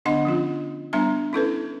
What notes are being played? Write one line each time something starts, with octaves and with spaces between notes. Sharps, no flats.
D3 B3 D4 D#5 F#5 C6
F3 C#4 F4
G3 B3 D4 E5 A#5
C#4 E4 A4 B4